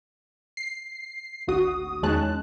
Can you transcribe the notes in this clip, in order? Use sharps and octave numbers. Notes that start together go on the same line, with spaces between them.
C7
G#1 D2 F#4 D#6
E2 D#3 G#3 C#4 A5 F#6